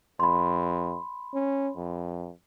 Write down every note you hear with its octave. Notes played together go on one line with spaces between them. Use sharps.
F2 B5 C6
C#4
F2